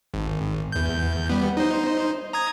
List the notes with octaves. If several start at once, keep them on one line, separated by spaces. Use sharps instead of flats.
G#1
E2 G6
G3 B3
D#4 C5
A#5 D#6 G#6